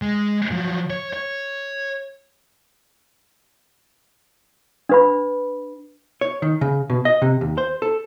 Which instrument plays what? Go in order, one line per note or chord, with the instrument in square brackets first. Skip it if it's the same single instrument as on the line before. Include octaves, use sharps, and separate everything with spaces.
[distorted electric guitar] G#3
F3 F#3
C#5
C#5
[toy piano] D4 B4 B5
[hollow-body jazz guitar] C#5
D#3
C#3
B2
D#5
C3
D#2
C5
A4